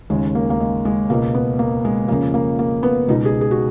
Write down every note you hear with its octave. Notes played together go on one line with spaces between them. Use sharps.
D#2 C#3 G#3
A#3
A#3
G#3
G#3
C#2 B2 A#3
B3
A#3
G#3
F2 C#3 A#3
A#3
A#3
B3
C#2 B2 D#4
G#4
G#4
F#4